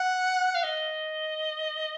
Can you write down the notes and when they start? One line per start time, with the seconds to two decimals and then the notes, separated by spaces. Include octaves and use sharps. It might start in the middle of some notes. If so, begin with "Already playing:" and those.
Already playing: F#5
0.55 F5
0.63 D#5